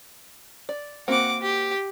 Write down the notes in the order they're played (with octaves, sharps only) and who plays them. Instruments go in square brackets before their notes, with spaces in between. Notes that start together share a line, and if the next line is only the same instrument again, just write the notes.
[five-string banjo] D5
[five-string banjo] A#3 C4 F#4 [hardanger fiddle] F#5 D6
[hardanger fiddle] G4